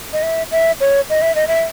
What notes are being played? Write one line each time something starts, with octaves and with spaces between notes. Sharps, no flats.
D#5
E5
E5
C#5
D#5
E5
D#5
E5